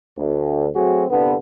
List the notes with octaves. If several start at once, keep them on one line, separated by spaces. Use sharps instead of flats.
D2
F#3 A3 C4 F#4 G#4
C2 G2 D3 B3